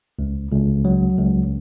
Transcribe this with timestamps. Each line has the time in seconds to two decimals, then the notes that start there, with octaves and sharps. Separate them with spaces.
0.19 C#2
0.51 C#2
0.85 F#3
1.18 C#2